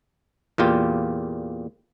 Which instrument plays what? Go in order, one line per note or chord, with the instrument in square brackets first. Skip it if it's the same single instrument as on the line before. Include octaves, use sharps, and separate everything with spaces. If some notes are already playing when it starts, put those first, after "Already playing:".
[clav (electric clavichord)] E2 A#2 F4 G4